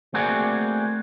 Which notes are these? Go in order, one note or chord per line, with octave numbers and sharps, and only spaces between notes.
A3 A#3 C4 F#4 G#4 D5